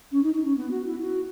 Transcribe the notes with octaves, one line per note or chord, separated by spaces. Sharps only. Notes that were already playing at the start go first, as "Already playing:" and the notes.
C#4
D#4
D#4
C#4
B3
F#4
E4
F#4